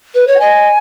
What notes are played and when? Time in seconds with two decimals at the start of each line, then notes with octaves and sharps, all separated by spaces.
0.14 B4
0.27 C#5
0.35 F#5
0.39 D#5 G#5